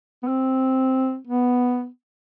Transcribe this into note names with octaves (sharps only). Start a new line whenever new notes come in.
B3
C4
B3